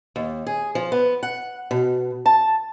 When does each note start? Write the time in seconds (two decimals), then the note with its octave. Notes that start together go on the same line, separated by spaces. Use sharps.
0.16 D#2
0.47 G#4
0.75 F3
0.92 B3
1.23 F#5
1.71 B2
2.26 A5